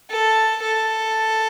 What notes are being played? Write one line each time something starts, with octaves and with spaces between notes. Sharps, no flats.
A4
A4